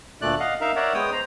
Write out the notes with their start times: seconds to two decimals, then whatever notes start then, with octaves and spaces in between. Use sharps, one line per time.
0.22 D2 A#2 A3 D5 F#6
0.40 D#5 F5 F#5
0.61 D#4 A#4 E5 F5
0.76 A#4 C#5 D5 E5 F#5
0.94 G#3 B3 C#5 G5 D#6
1.12 C5 A#5